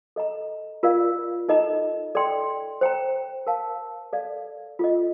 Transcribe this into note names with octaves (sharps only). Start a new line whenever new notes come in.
A4 D#5 A#5
F4 A#4 D5 F5
D#4 A4 D#5 A#5
A4 D5 G5 C6
C5 G5 A#5
A#4 F5 A5
A4 D5 F5
F4 A4 D#5